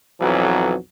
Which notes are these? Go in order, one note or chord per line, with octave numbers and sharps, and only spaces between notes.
B1 F2 E3 F#3